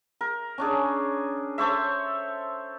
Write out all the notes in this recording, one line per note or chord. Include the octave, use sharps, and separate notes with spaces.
A#4
C#4 D4 G#4
A4 C5 C#5 E5